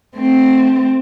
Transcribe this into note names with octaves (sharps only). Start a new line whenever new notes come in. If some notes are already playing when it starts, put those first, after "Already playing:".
A3 C4